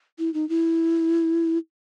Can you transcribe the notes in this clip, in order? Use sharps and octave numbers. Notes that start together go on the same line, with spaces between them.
E4
D#4
E4